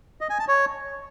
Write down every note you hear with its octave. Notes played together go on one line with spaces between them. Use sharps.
D#5
G#5
A5
C#5